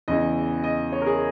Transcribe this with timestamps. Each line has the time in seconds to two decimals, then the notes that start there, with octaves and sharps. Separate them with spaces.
0.08 E2 C#3 E3 D#5
0.64 D#5
0.92 C#5
1.02 A#4
1.06 G#4